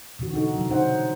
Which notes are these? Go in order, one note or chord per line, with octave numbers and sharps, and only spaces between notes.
B2 D3 E3 F#4
D#4 F#4 A4
C3 F#3
B2 D3 G3 D#4 C5 F#5